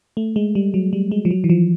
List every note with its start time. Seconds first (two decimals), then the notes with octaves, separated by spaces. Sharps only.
0.17 A3
0.36 G#3
0.55 G3
0.74 F#3
0.93 G3
1.11 G#3
1.25 F3
1.31 F#3
1.44 E3
1.50 F3